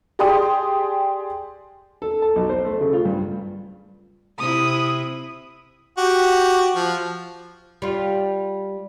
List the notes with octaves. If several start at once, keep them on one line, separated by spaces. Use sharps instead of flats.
G4 G#4 D5 G5 C6 D#6
A4
A5
B1
C5
A3
C#3
F4
G2
C3 E4 D#6
F#4 G4
F3
G3 F4